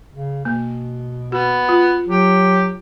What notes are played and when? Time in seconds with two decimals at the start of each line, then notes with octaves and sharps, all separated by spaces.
0.12 C#3
0.45 B2 A#3
1.32 B3 F#4
1.69 F4
2.08 F#3 G4